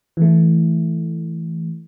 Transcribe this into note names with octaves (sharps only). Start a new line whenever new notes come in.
E3 A3